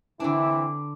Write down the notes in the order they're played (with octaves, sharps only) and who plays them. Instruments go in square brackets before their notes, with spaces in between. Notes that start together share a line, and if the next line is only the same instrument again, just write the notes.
[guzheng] D3 D4 [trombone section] E3 C4 E4